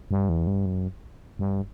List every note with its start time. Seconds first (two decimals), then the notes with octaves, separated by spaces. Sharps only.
0.11 G2
0.29 E2
0.47 G2
0.66 F#2
1.39 G2